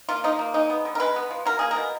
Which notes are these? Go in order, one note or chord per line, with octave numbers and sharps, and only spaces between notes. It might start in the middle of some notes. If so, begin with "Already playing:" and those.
A#3 F4
F3 D#4
A#3
G#3 D#4
B3
D3
A#4
G#3 B4
B3
F3
F#3 A#4
A#3 G#4
A#4
B2